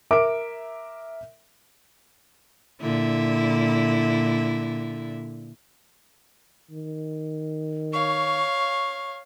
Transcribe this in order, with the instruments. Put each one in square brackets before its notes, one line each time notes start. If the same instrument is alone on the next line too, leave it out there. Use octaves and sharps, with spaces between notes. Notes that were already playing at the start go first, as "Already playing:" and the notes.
[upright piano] A#4 D6 [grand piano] E5 D7
[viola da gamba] A#2 D3 E4
[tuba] D#3
[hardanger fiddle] C#5 F5 [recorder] C#6